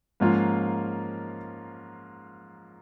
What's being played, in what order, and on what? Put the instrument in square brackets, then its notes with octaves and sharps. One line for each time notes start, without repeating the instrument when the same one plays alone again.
[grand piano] G#2 F3 A#3 C#4 F4